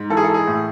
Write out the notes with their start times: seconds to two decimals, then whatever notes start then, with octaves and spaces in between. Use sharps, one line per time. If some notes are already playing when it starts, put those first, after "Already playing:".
Already playing: G#2
0.10 E3 A4
0.17 G#4
0.24 A4
0.34 G#4
0.47 A2